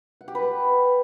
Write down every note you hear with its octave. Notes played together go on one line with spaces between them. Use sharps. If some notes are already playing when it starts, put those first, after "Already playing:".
F#5
G4
B4